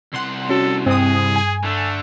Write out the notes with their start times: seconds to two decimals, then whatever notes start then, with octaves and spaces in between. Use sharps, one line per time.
0.13 C2 F#5 C6
0.49 C#4 F#4 A4
0.86 G2 C4 G#4 D#6
1.36 G#5
1.64 D3 A3